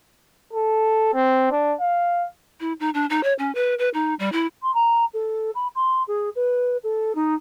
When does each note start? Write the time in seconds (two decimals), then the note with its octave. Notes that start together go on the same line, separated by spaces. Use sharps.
0.54 A4
1.14 C4
1.52 D4
1.81 F5
2.60 E4
2.80 D#4
2.94 D4
3.10 D#4
3.23 C#5
3.39 C#4
3.55 B4
3.79 B4
3.94 D#4
4.19 G3
4.32 E4
4.63 C6
4.74 A#5
5.14 A4
5.55 B5
5.75 C6
6.08 G#4
6.36 B4
6.84 A4
7.15 D#4